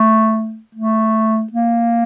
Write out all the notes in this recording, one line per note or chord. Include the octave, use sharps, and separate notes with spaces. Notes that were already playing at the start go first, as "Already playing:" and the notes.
Already playing: A3
A3
A#3